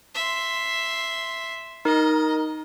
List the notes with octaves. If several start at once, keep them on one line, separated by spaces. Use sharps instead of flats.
E5 C6
D#4 A#4 D#5